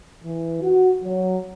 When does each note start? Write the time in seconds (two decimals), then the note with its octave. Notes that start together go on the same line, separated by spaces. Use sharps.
0.23 E3
0.61 F#4
1.03 F#3